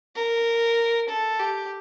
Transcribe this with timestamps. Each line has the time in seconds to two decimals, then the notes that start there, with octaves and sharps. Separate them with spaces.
0.16 A#4
1.09 A4
1.40 G4